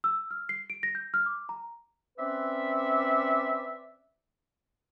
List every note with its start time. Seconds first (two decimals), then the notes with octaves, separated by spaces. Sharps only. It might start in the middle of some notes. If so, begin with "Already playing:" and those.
0.04 E6
0.31 F6
0.49 C7
0.70 D7
0.83 A#6
0.95 G6
1.14 F6
1.26 D6
1.49 A#5
2.18 C4 C#4 B4 D5 E5